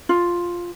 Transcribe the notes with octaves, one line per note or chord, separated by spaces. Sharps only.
F4